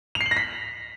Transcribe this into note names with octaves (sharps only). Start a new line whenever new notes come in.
F7
C7
F#7
A#6
B6